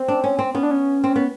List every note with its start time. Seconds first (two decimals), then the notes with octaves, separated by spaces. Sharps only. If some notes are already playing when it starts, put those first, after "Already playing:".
Already playing: C4
0.08 D4
0.24 C#4
0.39 C4
0.55 B3 C#4
0.63 D4
0.71 C#4
1.04 C4
1.16 B3